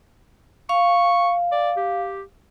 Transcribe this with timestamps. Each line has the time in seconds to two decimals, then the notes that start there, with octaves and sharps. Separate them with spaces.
0.69 F5 C#6
1.52 D5
1.77 G4